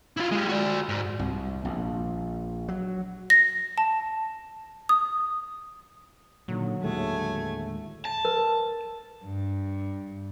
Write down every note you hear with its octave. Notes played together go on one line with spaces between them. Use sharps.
E4 F4
G#3 G4
F#4 D5
G#2
C2
A#1
F#3
A#6
A5
D#6
A#2 D3 D#3 F#3
D#2 A2 D3 G#3 A3 G#5
A5
A#4 B4
G2